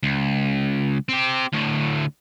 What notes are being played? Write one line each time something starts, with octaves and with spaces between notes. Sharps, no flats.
C#2
C4 G4
D2 A2